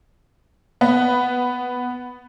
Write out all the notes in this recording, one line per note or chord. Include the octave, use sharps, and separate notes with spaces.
B3